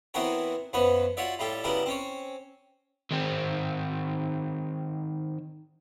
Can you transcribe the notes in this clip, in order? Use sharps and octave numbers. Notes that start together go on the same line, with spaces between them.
E3 B3 C4 F#4 A#4 C#5
F#2 F3 B3 B4 C#5
F4 F#4 C#5 D5 E5
A2 G3 F4 G4 A4
C#3 G3 B3 E4 F#4 A#4
C4 C#4 C#5
D#3 C4